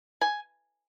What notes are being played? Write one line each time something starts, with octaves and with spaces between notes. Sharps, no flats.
G#5